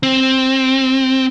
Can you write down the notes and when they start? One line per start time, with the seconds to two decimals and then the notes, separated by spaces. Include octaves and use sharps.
0.03 C4